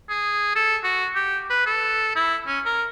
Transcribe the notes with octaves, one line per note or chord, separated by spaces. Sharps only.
G#4
A4
F#4
G4
B4
A4
E4
C#4
A#4